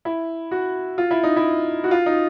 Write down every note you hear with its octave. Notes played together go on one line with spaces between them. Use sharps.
E4
F#4
F4
E4
D#4
E4
F#4
F4
D#4